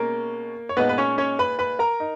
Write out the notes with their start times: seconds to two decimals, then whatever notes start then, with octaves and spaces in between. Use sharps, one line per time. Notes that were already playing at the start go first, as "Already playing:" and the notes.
Already playing: B2 G#3 A#3 C#4 A#4
0.69 C#5
0.77 A#2 G#3 B3 D#4 B4
0.89 B4
0.98 C#4 C#5
1.18 C#4 C#5
1.39 B4 B5
1.59 B4 B5
1.79 A#4 A#5
2.00 D#4